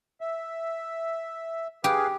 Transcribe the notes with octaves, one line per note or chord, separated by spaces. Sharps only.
E5
G4 G#4 B4 F5